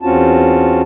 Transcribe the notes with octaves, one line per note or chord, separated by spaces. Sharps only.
E2 C4 C#4 F4 F#4 A5